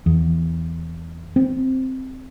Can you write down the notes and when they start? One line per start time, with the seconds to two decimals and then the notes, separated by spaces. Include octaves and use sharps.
0.06 E2
1.36 C4